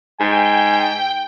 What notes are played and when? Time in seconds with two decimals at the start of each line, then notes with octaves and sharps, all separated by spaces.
0.20 G#2 G5 G#5